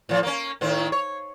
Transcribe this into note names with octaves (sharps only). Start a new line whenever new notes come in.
A2 F3
A#3 C#4
A2 D#3 C4
C#5